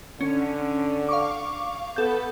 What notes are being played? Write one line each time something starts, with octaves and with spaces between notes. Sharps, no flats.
D3 C#4
F5 C#6 D6
B3 A4 G6